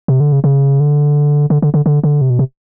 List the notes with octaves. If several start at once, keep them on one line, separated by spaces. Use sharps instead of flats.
C3
D3
C#3
C#3
D3
D3
D3
D3
D3
D3
C3
B2
C3